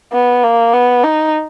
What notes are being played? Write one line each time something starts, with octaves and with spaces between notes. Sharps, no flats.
B3
A#3
B3
D#4